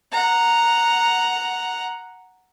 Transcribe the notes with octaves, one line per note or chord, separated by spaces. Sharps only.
F#5 A#5